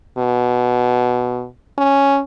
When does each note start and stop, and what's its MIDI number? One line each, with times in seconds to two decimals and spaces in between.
0.18 1.46 47
1.78 2.20 61